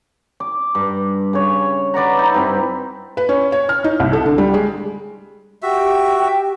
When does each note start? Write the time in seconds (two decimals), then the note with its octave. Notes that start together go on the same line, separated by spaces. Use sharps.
0.40 D6
0.75 G2
1.33 C#3 C#5
1.94 B4 D5 F#5 A#5
2.17 D#4 E5
2.34 G2 C4 E4
3.17 B4
3.29 C#4
3.52 C#5
3.69 F6
3.84 D#4
4.00 C2
4.13 A4
4.26 D3
4.38 G3
4.54 G#3
5.62 F#4 G4 E5 G5